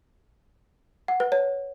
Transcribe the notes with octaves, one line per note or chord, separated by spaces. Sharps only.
F#5
B4
C#5